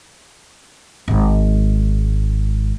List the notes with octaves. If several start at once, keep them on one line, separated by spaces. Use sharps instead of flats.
G#1 G#2